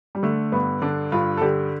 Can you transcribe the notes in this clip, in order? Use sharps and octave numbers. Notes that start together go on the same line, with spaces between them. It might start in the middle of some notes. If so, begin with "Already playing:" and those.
G3
D3 A3
G2 B3
D3 D4
G2 F4
A4
D3 G4